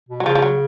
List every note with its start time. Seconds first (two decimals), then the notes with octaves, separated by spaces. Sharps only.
0.09 B2
0.20 F#3
0.25 C#3 F3
0.35 F3
0.42 F#3